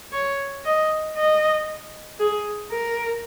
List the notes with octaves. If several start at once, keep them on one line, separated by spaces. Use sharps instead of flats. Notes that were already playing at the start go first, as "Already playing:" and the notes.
C#5
D#5
D#5
G#4
A#4